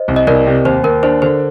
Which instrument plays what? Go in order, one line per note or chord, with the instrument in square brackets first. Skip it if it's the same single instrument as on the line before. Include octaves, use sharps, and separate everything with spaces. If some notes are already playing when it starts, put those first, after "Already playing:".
Already playing: [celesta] C5 D#5
[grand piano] C2
[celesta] D#5
[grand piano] C2 [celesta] A#4 D5
[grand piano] C3
[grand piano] D#2 [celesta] C5
[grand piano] D#2 [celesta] A#4
[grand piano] D4 [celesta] C5
[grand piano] D3 [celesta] C5